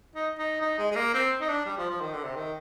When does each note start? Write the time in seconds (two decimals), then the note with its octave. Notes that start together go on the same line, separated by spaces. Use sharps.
0.16 D#4
0.39 D#4
0.61 D#4
0.78 G#3
0.91 G#3
0.96 A#3
1.14 C4
1.41 D#4
1.49 D4
1.66 G3
1.78 F3
1.90 F3
2.01 D#3
2.13 D3
2.24 C3
2.36 D#3